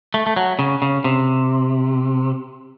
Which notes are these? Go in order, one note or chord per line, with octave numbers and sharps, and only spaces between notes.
A3
A3
F#3
C#3
C#3
C3